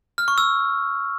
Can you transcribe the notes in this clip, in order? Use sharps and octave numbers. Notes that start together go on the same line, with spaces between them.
F6
C#6
E6